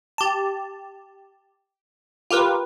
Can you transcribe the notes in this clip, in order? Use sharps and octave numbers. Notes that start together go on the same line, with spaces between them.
G4 A5
F4 G4 A#4 B4